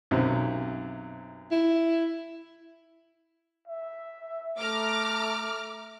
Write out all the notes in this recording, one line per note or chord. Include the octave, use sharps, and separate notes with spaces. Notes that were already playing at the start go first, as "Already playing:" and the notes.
B1 F#2 C3
E4
E5
A3 A#5 D6 F6